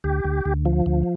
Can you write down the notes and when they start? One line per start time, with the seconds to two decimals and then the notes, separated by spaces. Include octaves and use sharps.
0.04 D2 G4
0.25 D2
0.45 D2
0.65 F3
0.86 D2